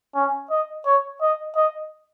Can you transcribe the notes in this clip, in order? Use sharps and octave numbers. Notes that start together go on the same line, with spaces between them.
C#4
D#5
C#5
D#5
D#5